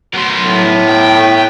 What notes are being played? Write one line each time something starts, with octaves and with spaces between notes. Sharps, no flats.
F#3 B3 A#4 C6
A2
G5